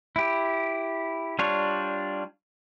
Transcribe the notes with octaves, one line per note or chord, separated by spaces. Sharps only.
E4 G4
G3 D4 F4 C#5